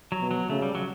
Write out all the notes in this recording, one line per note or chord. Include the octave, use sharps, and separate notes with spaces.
F#3
B2
F#3
C#3 A3
G3
F#3